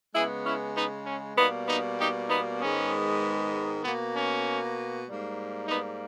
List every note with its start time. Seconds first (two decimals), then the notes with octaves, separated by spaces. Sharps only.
0.13 C#3 G#3 B3 E4 G#4
0.44 C#4 E4
0.75 B3 D#4
1.06 C#4
1.36 B2 G3 A#3 B3 D#4
1.67 B3 D#4
1.99 D#4 G4
2.29 B3 D#4
2.60 G#2 D#3 G#3 B3 C#4
3.83 B2 A#3 B3
4.15 C#4
5.06 G#2 G3 A#3
5.68 B3 D#4